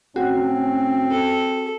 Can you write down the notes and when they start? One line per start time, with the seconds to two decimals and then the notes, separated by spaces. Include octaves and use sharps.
0.16 A2 C4 C#4 F#4
1.10 A4